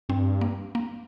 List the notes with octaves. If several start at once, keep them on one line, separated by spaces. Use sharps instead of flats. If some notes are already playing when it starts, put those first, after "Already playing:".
G2 C4
A#3
A#3